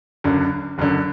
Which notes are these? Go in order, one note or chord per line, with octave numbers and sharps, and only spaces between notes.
F#1 F#2 D3
F#1 F#2 D3